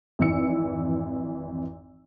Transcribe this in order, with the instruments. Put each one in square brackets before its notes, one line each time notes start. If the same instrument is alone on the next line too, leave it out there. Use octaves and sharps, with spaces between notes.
[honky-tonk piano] G#1 F2 E3 E6 C#7